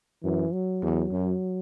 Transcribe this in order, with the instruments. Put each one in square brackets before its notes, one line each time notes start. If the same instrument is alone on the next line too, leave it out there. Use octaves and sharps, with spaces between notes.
[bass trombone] F#2 [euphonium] E3
[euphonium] F#3
[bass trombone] E2
F#2